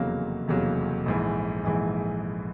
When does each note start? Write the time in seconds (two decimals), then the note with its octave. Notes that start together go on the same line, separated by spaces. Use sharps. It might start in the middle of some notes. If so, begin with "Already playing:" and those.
Already playing: F1 E2 C#3 F#3 A#3
0.48 F1 E2 C#3 F#3 A#3
1.06 A#1 G#2 E3
1.64 A#1 G#2 E3